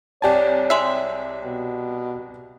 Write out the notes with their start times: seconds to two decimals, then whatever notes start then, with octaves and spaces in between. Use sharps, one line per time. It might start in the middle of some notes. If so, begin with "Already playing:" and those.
0.22 C2 G4 C#5 D5 G#5 A5
0.70 G#3 E5
1.44 B2